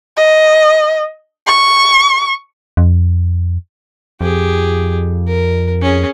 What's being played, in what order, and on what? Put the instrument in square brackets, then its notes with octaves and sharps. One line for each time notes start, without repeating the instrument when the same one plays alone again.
[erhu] D#5
C#6
[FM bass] F2
[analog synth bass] F2 [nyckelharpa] G4 G#4
[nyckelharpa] A#4
C#4 G#4